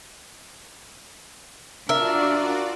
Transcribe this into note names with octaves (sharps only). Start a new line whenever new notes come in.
D4 F4 F#4 A#4 D5 E5